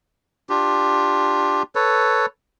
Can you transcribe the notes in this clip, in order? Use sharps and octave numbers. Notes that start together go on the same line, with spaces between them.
D4 F4 G4
A4 B4 C#5